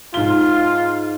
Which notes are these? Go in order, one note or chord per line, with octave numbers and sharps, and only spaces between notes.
G#2 F4 G7